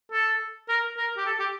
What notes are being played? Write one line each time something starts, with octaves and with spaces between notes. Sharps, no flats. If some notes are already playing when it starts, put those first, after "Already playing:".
A4
A#4
A#4
G4
A4
G4